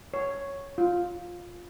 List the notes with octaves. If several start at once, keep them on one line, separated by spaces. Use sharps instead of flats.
C#5
F4